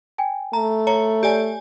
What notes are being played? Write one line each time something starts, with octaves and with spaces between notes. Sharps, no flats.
G5 G#5
A3 A5 A#5
C#5 A#5
G4 D5 G#5